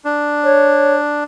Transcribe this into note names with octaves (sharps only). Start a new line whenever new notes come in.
D4
C#5